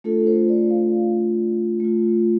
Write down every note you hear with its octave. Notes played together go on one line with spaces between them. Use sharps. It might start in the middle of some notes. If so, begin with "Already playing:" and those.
A3 D4 F4 A4
C5
D5
F5
A3 F4